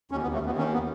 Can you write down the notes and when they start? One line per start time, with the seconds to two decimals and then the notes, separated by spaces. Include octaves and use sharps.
0.11 D#2 C#4
0.23 B3
0.27 D#2
0.34 A3
0.42 D#2 B3
0.57 D#3 C#4
0.74 B3